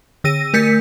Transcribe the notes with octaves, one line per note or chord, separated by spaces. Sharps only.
D3 E6 A#6 D#7
A3 A#4 G6 B6 C#7